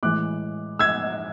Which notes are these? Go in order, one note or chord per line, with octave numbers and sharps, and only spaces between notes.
A2 E3 G#3 D6 F#6
E6 G#6